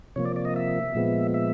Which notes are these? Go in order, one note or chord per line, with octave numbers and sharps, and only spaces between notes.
C3 F3 A#3 C#5
D5
D5
D#5
E5
A#2 F3 G#3 B3
E5